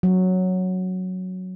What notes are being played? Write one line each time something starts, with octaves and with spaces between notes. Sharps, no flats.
F#3